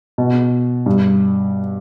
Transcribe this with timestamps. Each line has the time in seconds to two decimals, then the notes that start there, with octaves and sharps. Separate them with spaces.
0.18 B2
0.86 G2